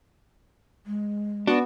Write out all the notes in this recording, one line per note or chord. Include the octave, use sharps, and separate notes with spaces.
G#3
B3 D4 F#4